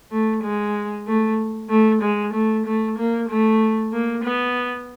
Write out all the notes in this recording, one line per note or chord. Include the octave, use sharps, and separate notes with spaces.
A3
G#3
A3
A3
G#3
A3
A3
A#3
A3
A#3
B3